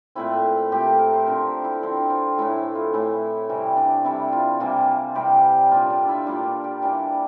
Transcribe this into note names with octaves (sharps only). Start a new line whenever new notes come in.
A#2 A3 C4 E4
A#2 A3 C4 G4
A#4
A#4
C5
D3 F3 C4 A#4
E4
D3 F3 C4 E4
F4
A2 E3 A3 E4
E4
F4
A2 E3 A3 E4
C3 E3 G3
D4
C3 E3 G3 E4
F4
C3 E3 G3 A#3 F4
C3 E3 G3 A#3 G4
A#2 G3 A#3 D4 F4
D4
E4
A#2 G3 A#3 D4 F4
G4
E3 G3 D4